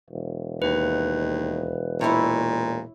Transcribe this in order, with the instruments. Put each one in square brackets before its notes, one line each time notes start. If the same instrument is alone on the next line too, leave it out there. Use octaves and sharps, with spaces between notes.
[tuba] E1
[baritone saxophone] D#2 [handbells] B4
[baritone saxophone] A#2 [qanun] E4 C#5